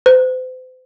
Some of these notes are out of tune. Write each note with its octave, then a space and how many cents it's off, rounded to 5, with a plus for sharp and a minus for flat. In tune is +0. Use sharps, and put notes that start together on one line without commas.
C5 -40